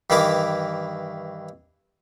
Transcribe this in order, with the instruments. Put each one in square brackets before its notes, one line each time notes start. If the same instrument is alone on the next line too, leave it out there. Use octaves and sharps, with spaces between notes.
[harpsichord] G2 D#3 E3 E4 A#4 D6